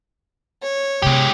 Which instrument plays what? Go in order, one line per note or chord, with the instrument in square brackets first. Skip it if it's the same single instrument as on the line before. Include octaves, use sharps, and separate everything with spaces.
[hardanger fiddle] C#5
[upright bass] C3 B3 [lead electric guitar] G#3 G4